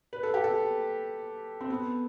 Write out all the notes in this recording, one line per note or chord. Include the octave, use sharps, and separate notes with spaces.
B4
A4
G4
A4
C4
B3